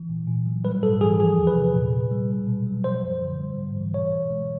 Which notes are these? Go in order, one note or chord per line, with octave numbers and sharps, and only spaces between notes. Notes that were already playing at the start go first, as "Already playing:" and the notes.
Already playing: E3
A#2
A#2
F#3
G3 B4
G#2 A4
E3 G#4
F3 G#4
E2
B4
C3
A#2
A#2
G3
B2
B2
F#3
F3 C5
F#2
D3
G3
G#2
E3
B2 C#5
B2
G#3